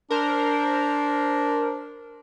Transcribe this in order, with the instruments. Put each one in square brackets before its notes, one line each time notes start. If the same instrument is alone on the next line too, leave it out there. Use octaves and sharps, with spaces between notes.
[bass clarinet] D4 [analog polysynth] A#4 C5